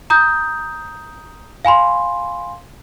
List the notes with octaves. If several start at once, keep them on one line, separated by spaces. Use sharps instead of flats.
A#5 D#6 G6
F5 G#5 B5 C6